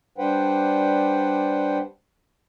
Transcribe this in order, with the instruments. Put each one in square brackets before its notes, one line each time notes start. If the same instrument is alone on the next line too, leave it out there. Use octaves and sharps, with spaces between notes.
[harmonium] G3 D4 B4 C5 F#5 G5